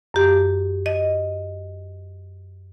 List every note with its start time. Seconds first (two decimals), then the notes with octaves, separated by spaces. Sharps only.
0.14 F#2 G4
0.86 D#5